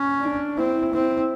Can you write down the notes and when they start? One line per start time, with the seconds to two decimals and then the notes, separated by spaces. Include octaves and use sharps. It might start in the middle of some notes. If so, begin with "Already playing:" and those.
Already playing: C#4
0.21 D4
0.57 C4 E4
0.94 C4